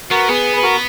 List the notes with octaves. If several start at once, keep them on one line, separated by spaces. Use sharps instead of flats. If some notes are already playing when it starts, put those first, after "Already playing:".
B3 F#4 A#4
B3 G#4 B4
B4
F#4 A#4